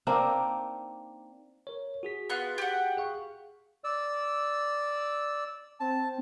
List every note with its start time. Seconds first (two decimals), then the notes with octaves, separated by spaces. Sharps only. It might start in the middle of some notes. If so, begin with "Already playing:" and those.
0.07 A#3 C4 D4 D#4
1.67 A#4 C#5
2.03 F#4 G#4 B6
2.30 B3 F4 F#6
2.58 G4 F#5
2.97 G#4 F5 C#6
3.84 D5 E6
5.80 C4 A5